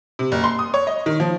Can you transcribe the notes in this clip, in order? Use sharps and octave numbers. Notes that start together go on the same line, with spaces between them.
C3
F#1
C6
D#6
C#5
D#5
D#3
F3